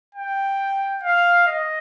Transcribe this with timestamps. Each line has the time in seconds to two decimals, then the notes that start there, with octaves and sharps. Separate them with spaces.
0.15 G5
1.03 F5
1.48 D#5